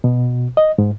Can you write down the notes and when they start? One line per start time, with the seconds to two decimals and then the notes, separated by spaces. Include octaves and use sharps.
0.04 B2
0.57 D#5
0.78 G#2